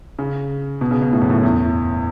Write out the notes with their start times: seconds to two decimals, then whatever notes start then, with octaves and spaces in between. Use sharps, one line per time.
0.19 C#3
0.81 B2
0.91 C#3
1.02 B2
1.13 A2
1.21 F#2
1.30 A2
1.43 E2